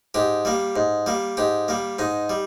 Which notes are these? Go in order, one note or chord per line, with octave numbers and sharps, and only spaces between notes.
G#2 G4
G3 A#3
G#2
G3 A#3
G#2 G4
G3 A#3
G#2 D#4
G3